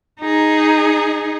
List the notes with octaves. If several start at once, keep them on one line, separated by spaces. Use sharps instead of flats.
D#4 G#4